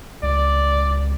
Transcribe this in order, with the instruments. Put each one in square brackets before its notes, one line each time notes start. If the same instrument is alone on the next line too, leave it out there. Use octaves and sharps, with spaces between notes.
[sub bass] C#2 [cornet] D5